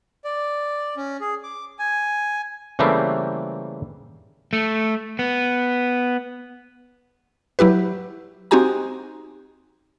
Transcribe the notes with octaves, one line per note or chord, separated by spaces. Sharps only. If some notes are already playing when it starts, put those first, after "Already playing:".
D5
C#4
G#4
D6
G#5
C#3 E3 G3 A3 A#3 C4
A3
B3
F#3 E4 G4 B4
C4 D#4 F#4 G4 G#5 A#5